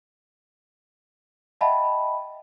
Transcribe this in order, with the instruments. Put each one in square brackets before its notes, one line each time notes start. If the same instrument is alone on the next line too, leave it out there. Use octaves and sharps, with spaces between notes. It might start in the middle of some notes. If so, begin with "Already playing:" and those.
[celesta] D#5 E5 F#5 G5 A5 B5